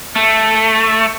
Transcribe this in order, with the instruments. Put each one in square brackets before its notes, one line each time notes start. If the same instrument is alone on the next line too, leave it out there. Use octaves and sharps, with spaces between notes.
[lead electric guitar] A3